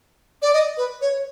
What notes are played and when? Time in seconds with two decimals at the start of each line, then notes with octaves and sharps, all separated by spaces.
0.42 D5
0.53 D#5
0.77 B4
1.01 C#5